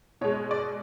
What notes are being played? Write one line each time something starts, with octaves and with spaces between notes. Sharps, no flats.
B2 G#3 C#5
D5